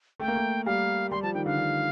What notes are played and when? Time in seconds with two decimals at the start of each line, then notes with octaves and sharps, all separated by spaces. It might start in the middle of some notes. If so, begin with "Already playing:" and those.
0.20 A3 G5
0.28 A#3
0.36 A3
0.66 G3 F5
1.11 G3 C6
1.23 F3 A5
1.34 D#3 G5
1.46 D3 F5
1.58 D3